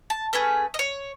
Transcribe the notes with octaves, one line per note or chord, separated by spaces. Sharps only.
A5
A3 C#4 G#4 B4
D#5
C#5